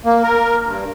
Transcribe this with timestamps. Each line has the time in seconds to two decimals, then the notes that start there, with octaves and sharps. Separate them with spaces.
0.05 A#3
0.23 A#4
0.65 G2